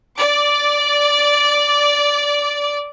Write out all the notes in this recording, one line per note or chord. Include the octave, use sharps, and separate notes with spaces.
D5 D6